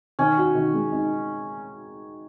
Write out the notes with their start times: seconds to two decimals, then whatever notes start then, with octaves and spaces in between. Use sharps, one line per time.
0.19 D#3 C#4
0.37 F#4
0.55 D#3
0.74 G#3
0.92 D#4